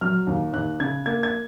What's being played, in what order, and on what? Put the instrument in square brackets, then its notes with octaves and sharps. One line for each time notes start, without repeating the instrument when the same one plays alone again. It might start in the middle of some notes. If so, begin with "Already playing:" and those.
[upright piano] F#3 F6
D#2
D#2 F#6
C#3 G#6
A#3 G#6
G#6